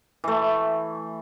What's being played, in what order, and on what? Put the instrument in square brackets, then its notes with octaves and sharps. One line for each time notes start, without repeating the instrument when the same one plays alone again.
[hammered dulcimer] E3 A3